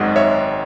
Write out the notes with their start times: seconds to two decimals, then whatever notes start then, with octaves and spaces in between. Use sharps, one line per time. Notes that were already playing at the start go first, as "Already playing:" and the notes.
Already playing: G#1 F#2 D#3 G#3 D#5 F#5
0.16 C#5 E5